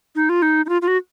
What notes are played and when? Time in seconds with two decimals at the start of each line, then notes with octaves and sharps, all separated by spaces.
0.15 D#4
0.29 F4
0.42 D#4
0.66 D#4
0.69 F4
0.82 F4
0.88 F#4